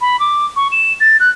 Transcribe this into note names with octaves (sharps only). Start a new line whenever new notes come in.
B5
D6
C#6
E7
A6
F#6